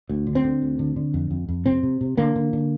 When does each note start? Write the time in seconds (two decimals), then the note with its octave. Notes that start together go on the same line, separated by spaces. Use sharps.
0.09 D2
0.27 D3
0.35 C4
0.44 D3
0.62 D2
0.79 D3
0.96 D3
1.14 F2
1.31 F2
1.48 F2
1.65 C3 C4
1.83 C3
2.01 C3
2.17 D3 A#3
2.36 D3
2.53 D3